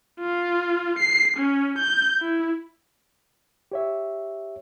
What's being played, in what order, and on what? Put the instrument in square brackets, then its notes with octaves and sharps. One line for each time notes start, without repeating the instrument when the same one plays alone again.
[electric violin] F4
C7
C#4
G6
E4
[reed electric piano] G4 C#5 E5